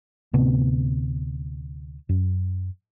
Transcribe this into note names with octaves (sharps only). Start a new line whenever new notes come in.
D2 A2 C3 B3
F#2